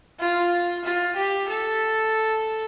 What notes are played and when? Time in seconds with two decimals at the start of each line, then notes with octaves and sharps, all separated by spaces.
0.19 F4
0.84 F4
1.16 G4
1.49 A4